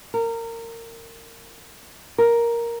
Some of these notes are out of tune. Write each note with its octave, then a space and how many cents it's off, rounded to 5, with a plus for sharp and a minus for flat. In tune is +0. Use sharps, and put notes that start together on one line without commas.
A#4 -25
A#4 +5